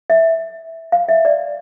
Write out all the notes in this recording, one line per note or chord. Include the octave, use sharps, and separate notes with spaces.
E5
F5
E5
D5